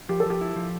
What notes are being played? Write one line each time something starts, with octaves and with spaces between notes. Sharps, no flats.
F3 G4
A4
F3 G4
E4
F3